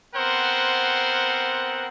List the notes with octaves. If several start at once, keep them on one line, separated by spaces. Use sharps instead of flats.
B3 C4 A#4 C5 F#5